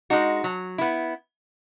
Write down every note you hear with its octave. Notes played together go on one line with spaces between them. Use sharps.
G#3 D#4 F#4
F#3
B3 E4